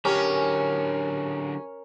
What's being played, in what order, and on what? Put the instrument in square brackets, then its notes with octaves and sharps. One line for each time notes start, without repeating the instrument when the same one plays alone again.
[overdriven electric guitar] D3 F#3 [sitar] C#4 [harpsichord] G4 [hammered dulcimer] A#4